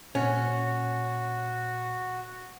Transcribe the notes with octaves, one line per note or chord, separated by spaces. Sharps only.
A#2 C#4 F#4